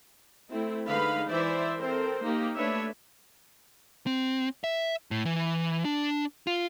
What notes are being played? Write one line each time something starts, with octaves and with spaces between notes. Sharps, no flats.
A3 C4 E4
D3 G#3 D#4 B4 F5 B5
E3 C5 D5 E5
C4 A4 A#4 C5
A#3 D#4 G4
A3 D4 B4 C#5 E5
C4
E5
A2
E3
D4
F4